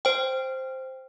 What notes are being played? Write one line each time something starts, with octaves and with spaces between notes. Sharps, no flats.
C5 G5